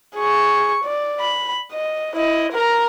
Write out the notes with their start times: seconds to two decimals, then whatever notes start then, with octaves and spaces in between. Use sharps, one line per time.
0.16 G#4 C#6
0.84 D5
1.20 B5
1.72 D#5
2.16 E4 D#5
2.53 A#4 A#5